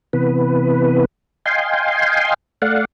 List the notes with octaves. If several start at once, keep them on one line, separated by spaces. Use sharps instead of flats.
C3 E3 B3 B4
D#5 F5 G5 G#5 C6
A3 D5 F5 F#5